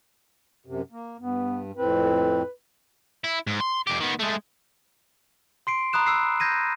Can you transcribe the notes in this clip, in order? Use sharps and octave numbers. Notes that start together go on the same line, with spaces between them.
F#2 C3
A#3
G2 B3
F2 A2 C4 B4
E4
G#2
C6
F2 G4
D#3 B3
G#3 A3
C6 C7 D7
A#5 B5 D#6 F#6 E7
E6 C7
G6 G#6 A#6 D#7